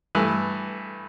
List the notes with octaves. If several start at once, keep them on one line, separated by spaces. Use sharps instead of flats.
G2 E3 A3